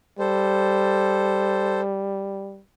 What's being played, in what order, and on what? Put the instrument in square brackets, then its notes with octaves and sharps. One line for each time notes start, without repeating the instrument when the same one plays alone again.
[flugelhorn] G3 [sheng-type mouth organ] A4 C5